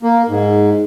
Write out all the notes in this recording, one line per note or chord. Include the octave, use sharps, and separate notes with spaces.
A#3
G#2